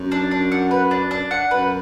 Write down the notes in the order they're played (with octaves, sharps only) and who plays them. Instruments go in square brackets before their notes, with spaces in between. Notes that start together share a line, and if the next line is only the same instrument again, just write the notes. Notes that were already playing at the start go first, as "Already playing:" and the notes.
Already playing: [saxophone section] F#2
[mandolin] D4
D4
F#5
B4
D4
D4
F#5
[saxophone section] F#2 [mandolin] B4